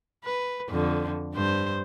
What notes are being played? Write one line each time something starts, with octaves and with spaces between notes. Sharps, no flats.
B4
F2 D3
G2 C5